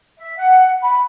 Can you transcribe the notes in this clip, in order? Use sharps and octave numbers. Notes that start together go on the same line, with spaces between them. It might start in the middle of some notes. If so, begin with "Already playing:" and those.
E5
F#5
B5